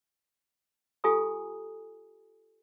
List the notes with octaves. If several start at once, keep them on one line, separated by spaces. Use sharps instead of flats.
F4 G4 A4 G#5 A#5 D#6